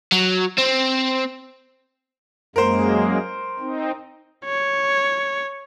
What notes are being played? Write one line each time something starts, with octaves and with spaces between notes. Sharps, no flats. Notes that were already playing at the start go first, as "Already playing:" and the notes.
F#3
C4
F#2 G#3 A#3 A#4 C5
C4 D#4
C#5